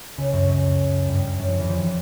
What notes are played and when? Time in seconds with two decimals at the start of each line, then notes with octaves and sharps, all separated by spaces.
0.17 C#2 C#3
0.33 F#2 F#3
0.47 F#2 F#3
1.08 G2 G3
1.38 F#2 F#3
1.48 F2 F3
1.58 E2 E3
1.69 F2 F3
1.79 E3